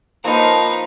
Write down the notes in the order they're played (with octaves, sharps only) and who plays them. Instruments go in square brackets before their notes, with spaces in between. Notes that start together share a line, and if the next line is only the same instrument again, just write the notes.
[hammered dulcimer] F3 B4 [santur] A#3 [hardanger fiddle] D#4 F5